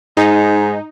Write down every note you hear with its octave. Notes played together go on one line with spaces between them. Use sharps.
G#2 D#4